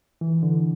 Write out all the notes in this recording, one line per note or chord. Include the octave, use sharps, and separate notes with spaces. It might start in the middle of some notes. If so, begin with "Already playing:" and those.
E3
D3